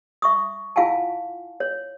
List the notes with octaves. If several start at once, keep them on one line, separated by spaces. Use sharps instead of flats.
E5 C#6 D#6
E4 F4 F5 F#5 G#5 A5
C#5